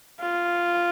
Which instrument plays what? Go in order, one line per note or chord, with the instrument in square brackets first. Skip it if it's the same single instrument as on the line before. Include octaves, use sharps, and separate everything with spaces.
[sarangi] F4